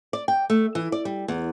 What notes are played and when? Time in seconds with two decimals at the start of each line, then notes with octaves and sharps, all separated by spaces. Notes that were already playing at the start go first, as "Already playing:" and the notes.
0.13 D5
0.28 G5
0.50 A3
0.75 E3
0.92 D5
1.05 G3
1.28 E2